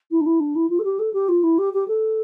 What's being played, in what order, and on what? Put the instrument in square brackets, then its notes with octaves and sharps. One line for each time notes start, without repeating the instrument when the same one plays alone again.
[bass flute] E4
D4
E4
D4
E4
F4
A4
G4
A4
G4
F4
E4
G4
G4
A4